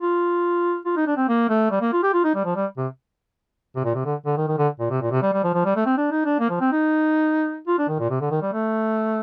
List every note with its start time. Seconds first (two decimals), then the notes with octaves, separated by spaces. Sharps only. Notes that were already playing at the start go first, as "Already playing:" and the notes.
0.01 F4
0.85 F4
0.96 D#4
1.07 D4
1.17 C4
1.28 A#3
1.49 A3
1.71 G3
1.81 A#3
1.93 F4
2.03 G4
2.13 F4
2.24 D#4
2.35 G3
2.45 F3
2.56 G3
2.77 C3
3.76 C3
3.84 A#2
3.95 C3
4.05 D3
4.26 D3
4.37 D#3
4.48 D#3
4.58 D3
4.80 A#2
4.90 C3
5.01 A#2
5.11 C3
5.22 G3
5.33 G3
5.44 F3
5.54 F3
5.65 G3
5.76 A3
5.86 C4
5.97 D4
6.11 D#4
6.25 D4
6.40 A#3
6.50 F3
6.60 C4
6.72 D#4
7.67 F4
7.78 D4
7.88 D#3
7.99 A#2
8.10 C3
8.21 D3
8.31 D#3
8.42 G3
8.53 A3